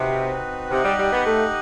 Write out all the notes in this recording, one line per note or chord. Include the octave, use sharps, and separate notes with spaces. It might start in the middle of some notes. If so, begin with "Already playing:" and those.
Already playing: C3 C4 D#4 F#4 B4
C3 D#4 G4 D#5 F#5
G3
G3
B3
A3